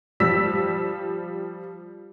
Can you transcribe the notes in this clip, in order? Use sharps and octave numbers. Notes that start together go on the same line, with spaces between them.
F3 G3 E6 B6